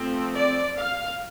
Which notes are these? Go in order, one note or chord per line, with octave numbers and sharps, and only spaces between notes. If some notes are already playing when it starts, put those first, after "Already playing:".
Already playing: F3 A3 C4
D5
F5